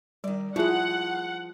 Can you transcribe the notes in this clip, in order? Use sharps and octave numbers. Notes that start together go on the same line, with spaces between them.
D#3 G3 D5
F3 G#3 E4 F4 G#4 F#5